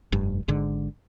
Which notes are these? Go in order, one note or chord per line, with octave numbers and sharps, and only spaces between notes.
F1 G2
G#1 G#2 D3